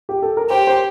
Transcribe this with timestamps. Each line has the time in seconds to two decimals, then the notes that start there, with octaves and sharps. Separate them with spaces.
0.09 G4
0.22 A4
0.37 A#4
0.49 G4 C5
0.67 C5